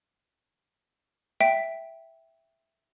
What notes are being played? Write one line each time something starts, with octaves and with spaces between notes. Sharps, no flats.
E5 G5 D7